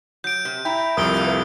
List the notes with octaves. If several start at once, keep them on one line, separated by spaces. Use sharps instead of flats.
F#3 G6 D7
C3
E4 G5 A#5
C2 F2 A#4 D#6 D7 G7
G3 A3 A#3
B4